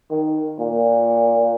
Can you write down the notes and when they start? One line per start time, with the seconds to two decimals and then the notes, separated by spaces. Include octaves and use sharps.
0.11 D#3
0.59 A#2